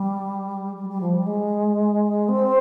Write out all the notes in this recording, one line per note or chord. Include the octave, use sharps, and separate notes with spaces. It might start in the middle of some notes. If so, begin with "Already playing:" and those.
Already playing: G3
G3
G3
F3
G3
G#3
C4